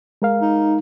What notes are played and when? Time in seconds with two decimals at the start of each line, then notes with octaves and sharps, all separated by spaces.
0.22 G#3 A#4 F5
0.41 D#4